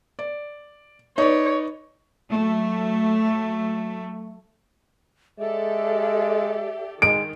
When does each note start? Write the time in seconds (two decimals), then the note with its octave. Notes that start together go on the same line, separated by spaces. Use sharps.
0.19 D5
1.18 D#4 B4 C#5 D5
2.29 F#3 A3
5.39 G#3 G4 A4 D5 E5
7.02 D#3 G#3 D7